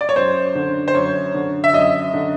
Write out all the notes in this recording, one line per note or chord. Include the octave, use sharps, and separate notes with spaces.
D5
C#5
F#2 C5
D3
C5
F#2 C#5
D3
E5
F#2 D#5
D3